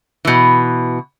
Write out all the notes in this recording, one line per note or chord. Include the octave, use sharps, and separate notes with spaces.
B2 E3